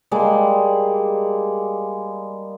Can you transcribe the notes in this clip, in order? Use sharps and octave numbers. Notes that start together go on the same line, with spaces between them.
G3 G#3 A#3 D5